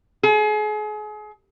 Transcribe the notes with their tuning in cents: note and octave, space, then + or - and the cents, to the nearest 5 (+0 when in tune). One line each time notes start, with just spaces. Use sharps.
G#4 +35